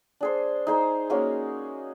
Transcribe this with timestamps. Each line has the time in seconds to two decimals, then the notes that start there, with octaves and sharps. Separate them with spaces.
0.21 D4 G#4 C5
0.67 D#4 G#4 C5
1.10 G#3 A#3 C#4 F#4